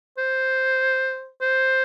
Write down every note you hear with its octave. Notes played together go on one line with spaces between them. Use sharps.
C5
C5